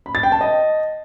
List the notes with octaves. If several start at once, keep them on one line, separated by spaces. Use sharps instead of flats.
B5
A6
G5
A5
D#5